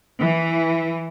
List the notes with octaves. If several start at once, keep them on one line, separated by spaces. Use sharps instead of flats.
E3